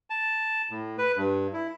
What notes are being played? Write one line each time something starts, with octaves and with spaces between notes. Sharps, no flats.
A5
A2
B4
G2
E4